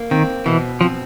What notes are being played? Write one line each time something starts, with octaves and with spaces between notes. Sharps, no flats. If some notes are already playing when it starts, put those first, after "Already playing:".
Already playing: A#3
D#3 C4
B2 E3
F3 C4